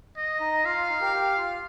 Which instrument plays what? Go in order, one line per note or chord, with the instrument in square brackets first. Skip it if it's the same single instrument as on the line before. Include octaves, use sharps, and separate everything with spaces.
[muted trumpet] D#5
[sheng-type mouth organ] D#4
[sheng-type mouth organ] F4 [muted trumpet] F5
[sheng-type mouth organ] F4
D#4
G4 A#4
G4
F4